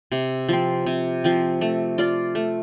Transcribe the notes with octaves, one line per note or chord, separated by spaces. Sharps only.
C3
F3 C4
C3
F3 C4
A3
F4 D5 F5
A3